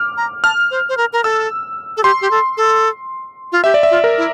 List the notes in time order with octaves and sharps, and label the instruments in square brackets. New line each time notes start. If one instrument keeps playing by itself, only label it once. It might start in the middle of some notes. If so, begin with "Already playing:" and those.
Already playing: [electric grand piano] D6 F6
[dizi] A#5
[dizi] A5 [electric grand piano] F6
[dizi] C5
C5
A#4
A#4
[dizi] A4 [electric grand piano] E6
[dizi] A4
[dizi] G4 [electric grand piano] C6
[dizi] G4
A4
A4
F4
[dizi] G4 [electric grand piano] E5
[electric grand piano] D5
E5
[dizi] F4
[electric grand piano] A#4
[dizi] E4